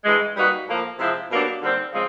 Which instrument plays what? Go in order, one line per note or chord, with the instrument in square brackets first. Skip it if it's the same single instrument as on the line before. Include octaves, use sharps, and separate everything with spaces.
[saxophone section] G2 E3 G#3
G3 A#3 D#4 F#4 B4
A2 F3 A#3
C3 F3 G#3 C4 E4
B2 F#3 A#3 D4 G4
D#2 D3 G3 C4
C#3 F3 G#3 C4